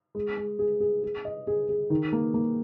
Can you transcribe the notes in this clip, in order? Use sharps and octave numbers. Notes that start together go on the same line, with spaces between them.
G#3
G#3
G#4
G#4
G#4
D#5
G#4
G#4
D#3
A#3
A#3